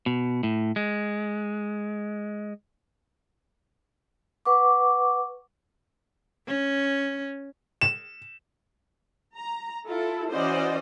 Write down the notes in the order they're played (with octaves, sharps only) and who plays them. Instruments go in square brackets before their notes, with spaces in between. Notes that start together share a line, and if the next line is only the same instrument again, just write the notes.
[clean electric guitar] B2
A2
G#3
[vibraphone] B4 F#5 C#6 D6
[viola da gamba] C#4
[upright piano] E7
[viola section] A#5
E4 F4 A4
E3 C#4 F#4 C5 D5 D#5